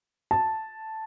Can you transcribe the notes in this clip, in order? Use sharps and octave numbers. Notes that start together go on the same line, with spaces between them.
A5